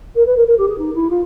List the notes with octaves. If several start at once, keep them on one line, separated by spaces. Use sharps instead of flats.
A#4
B4
A#4
A#4
G4
G#4
D#4
E4
F4